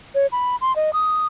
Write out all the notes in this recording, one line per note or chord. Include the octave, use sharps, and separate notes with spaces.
C#5
B5
C6
D#5
D#6